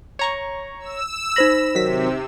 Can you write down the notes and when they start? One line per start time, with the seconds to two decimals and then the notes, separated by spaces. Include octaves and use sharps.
0.19 C#5 A#5 C#6
0.80 E6
1.36 D#4 C5 B5 A#6
1.75 C3 D#3 F#3 B6